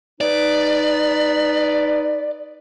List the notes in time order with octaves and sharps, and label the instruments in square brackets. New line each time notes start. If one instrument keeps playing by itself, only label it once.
[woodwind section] D#4 B4 [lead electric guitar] D5